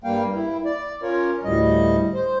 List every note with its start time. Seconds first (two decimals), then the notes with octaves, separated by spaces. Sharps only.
0.04 G2 G3 A#3 F5 G5
0.34 E4
0.65 D5
1.02 C#4 F4 A#4 C#5
1.44 D2 A2 G3 D#5
2.14 C5